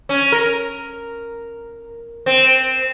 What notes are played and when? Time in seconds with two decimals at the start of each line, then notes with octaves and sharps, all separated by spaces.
0.09 C#4
0.32 A#4
2.26 C4